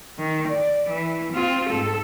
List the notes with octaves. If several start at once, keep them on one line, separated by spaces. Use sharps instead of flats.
D#3
D5
E3
C4 F4
G#2 A4